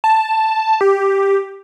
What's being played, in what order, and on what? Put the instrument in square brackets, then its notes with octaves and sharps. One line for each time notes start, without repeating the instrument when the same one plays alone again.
[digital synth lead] A5
G4